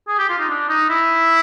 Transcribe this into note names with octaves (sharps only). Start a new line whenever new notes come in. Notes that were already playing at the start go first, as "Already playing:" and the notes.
G#4
G4
F4
D#4
D4
D#4
E4